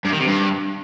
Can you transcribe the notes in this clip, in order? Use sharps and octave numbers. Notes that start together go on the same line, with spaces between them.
G2
D#3
C3
G2